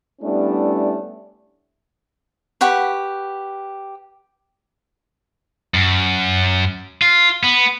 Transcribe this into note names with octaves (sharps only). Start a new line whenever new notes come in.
G3 A3 B3 C#4 D4 E4
G4 B4 F#5 C#6
F#2
F4
B3